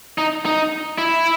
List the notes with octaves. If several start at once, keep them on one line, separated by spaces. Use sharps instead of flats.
D#4
D#4
E4